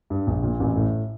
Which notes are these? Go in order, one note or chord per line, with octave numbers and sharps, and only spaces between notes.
G2
A#1
A#2
A1
A2